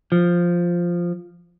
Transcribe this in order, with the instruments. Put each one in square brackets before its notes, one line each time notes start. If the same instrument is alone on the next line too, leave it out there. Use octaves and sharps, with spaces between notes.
[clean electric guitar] F3